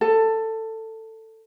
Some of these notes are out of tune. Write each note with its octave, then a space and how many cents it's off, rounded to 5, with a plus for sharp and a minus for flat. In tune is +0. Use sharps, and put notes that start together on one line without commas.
A4 +15